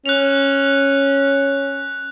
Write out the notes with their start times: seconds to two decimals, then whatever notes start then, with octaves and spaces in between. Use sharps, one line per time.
0.06 C#4 F#6 F7